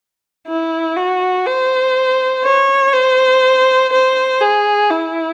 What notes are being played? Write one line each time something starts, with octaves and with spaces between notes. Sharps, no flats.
E4
F#4
C5
C#5
C5
C5
G#4
E4